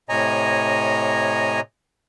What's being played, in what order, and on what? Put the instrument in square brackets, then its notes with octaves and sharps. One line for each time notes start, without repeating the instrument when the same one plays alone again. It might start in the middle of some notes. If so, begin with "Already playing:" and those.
[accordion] A2 C3 C#5 D#5 G#5 A#5